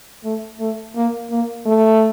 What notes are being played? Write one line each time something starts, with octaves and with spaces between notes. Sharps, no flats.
A3
A3
A#3
A#3
A3